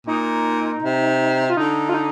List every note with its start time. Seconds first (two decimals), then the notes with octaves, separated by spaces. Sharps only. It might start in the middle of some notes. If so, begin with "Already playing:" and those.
0.07 A#2 D#4
0.83 C3
1.49 F4
1.57 D3 D#4
1.89 F4
1.94 D#4